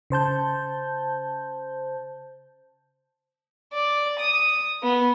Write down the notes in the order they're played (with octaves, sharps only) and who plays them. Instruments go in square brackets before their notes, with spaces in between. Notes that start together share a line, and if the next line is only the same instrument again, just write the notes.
[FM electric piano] C#3 C5 A5 G6
[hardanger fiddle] D5
D#6
B3